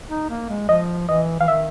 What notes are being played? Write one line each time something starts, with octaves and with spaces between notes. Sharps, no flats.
D#4
A#3
G#3
F3 D#5
E3 D#5
E3 F5
D#3 E5